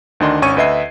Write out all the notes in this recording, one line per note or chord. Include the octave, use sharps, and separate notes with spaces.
D2 D#3 D4 D#5 C6
G#1 C#4 G#5 C#6 G#6 D#7
D2 B4 D#5 E5 C7